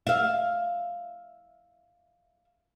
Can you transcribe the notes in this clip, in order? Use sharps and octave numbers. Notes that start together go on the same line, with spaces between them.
E5 F5